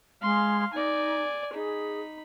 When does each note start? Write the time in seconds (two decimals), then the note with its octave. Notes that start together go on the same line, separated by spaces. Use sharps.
0.22 G#3 F5 C6
0.73 D#4 D5 G#5
1.54 D#4 G#4 B5